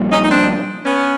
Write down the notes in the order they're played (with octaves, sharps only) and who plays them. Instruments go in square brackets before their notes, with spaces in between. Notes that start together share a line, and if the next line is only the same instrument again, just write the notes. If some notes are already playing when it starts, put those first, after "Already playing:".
Already playing: [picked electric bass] A#1 A#2 G3
[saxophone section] C#4 D#4
D#4
C4 D4
B3 C#4